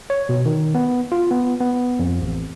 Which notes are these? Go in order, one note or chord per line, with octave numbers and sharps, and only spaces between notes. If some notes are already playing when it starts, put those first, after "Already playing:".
C#5
B2
D#3
B3
F4
B3
B3
F2
A1